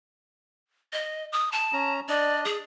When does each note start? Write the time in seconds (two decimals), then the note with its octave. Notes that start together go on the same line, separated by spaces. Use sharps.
0.93 D#5
1.32 D#6
1.52 A5
1.73 C#4 A#5
2.09 D4 D5 D#5
2.45 G#4